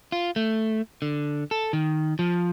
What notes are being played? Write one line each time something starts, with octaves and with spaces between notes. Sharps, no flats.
F4
A3
D3
A4
D#3
F3